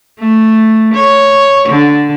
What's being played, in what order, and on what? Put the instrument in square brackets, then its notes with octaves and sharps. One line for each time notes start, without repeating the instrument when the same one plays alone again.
[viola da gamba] A3
C#5
D3